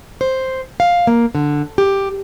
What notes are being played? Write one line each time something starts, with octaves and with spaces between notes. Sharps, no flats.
C5
F5
A#3
D3
G4